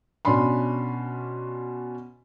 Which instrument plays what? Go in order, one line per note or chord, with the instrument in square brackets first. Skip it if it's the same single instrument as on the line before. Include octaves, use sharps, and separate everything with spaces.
[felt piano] B2 C#4 D4 B5 C6